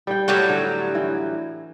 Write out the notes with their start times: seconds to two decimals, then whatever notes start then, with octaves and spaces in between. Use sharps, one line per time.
0.07 G3 G5
0.28 A2 F#3 G3 G4 C#5 F#5
0.49 D3
0.95 E3